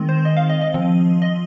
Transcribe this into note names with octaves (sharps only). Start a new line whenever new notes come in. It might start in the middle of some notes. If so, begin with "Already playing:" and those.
Already playing: D#3 G#3 C4
C5
D#5
F5
D#5
D#5
F3 C4
D#5